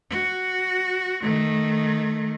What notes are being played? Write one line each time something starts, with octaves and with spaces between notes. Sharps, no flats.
F#4
D#3 A3